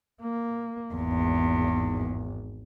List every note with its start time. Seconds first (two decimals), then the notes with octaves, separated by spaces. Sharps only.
0.22 A#3
0.95 G#1 E2